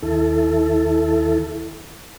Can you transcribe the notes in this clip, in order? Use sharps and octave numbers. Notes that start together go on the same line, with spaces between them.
D#2 E4 A4